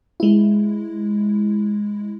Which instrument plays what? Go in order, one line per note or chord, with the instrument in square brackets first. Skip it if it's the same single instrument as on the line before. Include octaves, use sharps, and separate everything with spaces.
[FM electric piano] G#3 E4